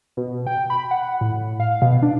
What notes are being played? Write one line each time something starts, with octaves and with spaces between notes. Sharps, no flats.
B2
G5
B5
F#5
A2
F5
B2
D4